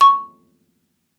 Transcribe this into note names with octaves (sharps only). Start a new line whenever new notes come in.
C#6